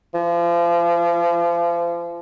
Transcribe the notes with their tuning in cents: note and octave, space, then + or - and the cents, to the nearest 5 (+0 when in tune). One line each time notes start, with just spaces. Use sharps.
F3 -35